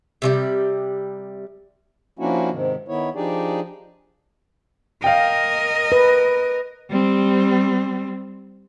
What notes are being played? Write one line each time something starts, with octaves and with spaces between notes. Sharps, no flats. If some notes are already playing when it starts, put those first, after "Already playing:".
C3 D#3 G3
F3 A#3 C#4 D4 E4 F#4
G#2 C3 D#3
D#3 B3 E4 C#5
F3 D4 D#4 G4 G#4 D5
A#4 D#5 F5 G5
B4
G3 C4